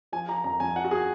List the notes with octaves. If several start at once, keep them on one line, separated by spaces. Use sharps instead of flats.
F3 G#5
F3 A#5
F2 A#5
F2 G#5
F3 F#5
F#4
G#4